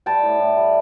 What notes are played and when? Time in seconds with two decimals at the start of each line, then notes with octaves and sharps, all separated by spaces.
0.06 G3 G5 A5
0.23 A2
0.39 A2
0.56 G3